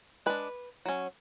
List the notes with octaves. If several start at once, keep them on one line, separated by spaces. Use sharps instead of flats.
G#3 D4 B4
F#3 C#4